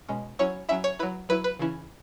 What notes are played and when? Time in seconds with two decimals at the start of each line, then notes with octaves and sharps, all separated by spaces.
0.09 B2 G#3 C#4
0.39 F#3 C#4 E4 C#5
0.69 F#3 C#4 E4 E5
0.84 C#5
0.99 F#3 E4 B4
1.29 F#3 E4 B4
1.44 B4
1.59 C#3 E3 C#4 E4